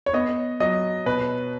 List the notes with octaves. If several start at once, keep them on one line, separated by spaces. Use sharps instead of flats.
C#5
B3 D#5
F#3 D#5
B2 B4